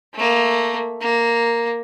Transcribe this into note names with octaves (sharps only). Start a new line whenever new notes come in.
A3 A#3
A#3